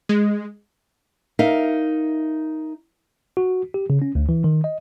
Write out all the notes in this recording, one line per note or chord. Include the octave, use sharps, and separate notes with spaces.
G#3
D#4 A#4 E5 F5
F#4
G4
C#3
C#4
D2
E3
D#3
D#5